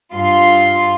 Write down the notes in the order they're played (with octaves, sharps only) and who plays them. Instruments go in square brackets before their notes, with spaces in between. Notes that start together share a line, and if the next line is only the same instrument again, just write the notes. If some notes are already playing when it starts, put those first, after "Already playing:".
[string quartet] G2 F4 C6